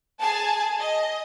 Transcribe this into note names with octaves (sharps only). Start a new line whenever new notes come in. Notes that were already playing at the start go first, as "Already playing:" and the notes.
G#4 G#5 A5
D#5